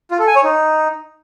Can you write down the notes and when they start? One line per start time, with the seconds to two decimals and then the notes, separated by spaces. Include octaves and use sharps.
0.11 F4
0.19 A4
0.27 G#5
0.35 C#5
0.44 D#4